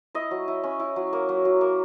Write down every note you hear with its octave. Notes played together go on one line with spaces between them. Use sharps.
E4 D#5
F#3
E4
C#4
E4
F#3
A#3
F#3
F#3
A#3